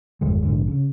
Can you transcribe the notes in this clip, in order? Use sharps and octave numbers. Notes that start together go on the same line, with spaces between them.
G1 E2 D#3 G#3
A#1 G#2 D3
C#3